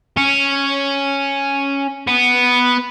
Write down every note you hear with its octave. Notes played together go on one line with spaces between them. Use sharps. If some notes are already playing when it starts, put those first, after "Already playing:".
C#4
B3